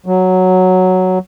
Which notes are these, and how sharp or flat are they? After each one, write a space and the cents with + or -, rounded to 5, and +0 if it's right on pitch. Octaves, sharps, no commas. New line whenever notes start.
F#3 +0